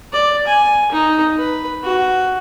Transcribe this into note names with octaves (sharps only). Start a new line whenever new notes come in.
D5
G#5
D#4
B4
F#4